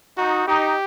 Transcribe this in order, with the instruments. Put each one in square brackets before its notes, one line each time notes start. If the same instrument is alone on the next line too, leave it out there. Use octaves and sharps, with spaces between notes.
[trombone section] D#4 [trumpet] F#4
[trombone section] D#4 [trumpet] G4